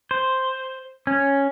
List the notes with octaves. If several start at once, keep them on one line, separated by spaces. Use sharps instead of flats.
C5
C#4